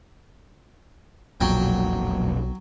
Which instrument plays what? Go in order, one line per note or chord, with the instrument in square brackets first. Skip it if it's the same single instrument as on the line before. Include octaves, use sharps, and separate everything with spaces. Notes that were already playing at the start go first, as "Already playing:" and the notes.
[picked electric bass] E1 F2 A#2 [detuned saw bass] B1 [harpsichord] F#3 G5